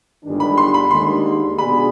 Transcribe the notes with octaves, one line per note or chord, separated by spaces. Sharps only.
G1 G2 D#3 G#3 D4
B5
C6
B5
D#2 D3 G#3 C6
B2 B3 D4 G#4 B5